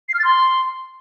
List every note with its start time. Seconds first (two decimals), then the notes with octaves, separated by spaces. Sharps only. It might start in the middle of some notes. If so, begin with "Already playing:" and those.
0.09 C7
0.14 F6
0.19 A6
0.25 C6